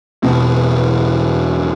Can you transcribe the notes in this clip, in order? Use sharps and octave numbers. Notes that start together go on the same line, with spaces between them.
E1 B1 B2 C4